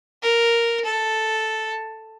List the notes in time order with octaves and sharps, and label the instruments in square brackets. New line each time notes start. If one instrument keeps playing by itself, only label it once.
[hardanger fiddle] A#4
A4